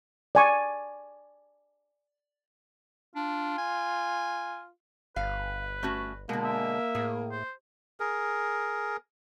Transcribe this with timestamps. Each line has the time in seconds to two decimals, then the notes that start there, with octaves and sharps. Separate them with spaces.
0.35 D5 G#5 C#6
3.16 D4 F4
3.58 G#5
5.16 G1 B4 F5
5.83 A3 C#4 F#4
6.29 B2 D3 G#3 A#3
6.44 E5
6.95 A2 G#4
7.31 C5
8.00 G#4 A#4